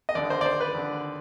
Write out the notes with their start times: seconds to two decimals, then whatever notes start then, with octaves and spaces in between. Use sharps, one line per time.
0.09 D#5
0.15 D#2 D3 D5
0.30 C5
0.41 D5
0.46 C5
0.60 B4
0.74 D#2 D3